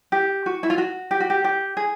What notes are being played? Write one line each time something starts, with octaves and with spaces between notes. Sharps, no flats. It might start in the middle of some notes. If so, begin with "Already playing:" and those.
G4
F#4
E4
F4
F#4
G4
F#4
G4
G4
G#4